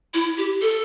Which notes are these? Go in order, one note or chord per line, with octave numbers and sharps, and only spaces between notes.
E4
G4
A4